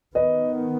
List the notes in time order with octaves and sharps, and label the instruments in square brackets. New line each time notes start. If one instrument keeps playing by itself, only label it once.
[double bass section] D#3 B3 [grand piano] B4 D#5